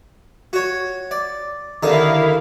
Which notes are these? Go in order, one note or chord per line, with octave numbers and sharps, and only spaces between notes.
F#4 C#5
D5
D#2 D3 E4 A#4 D#5 F5